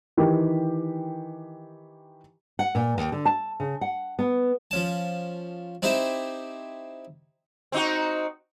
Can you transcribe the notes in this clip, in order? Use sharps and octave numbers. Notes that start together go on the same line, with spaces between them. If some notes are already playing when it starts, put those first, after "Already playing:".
D#3 E3 G4
F#5
A#2
D#2
D3
A5
C#3
F#5
B3
F3 C#4 A5
C4 D#4 E4 G4 C5 E5
C4 D#4 F#4